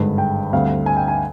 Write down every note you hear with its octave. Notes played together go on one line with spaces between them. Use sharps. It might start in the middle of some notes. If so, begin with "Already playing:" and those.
Already playing: G#1 G2 D3 G#3 B4
G5
D2 D3 G3 C4 F5
G#5
G5
G#5